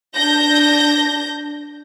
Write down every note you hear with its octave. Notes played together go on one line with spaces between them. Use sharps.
D4 G6 A#6